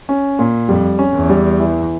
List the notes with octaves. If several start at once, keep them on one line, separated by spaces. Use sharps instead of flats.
C#4
A#2
F2 G3
C#4
E2
G3
E3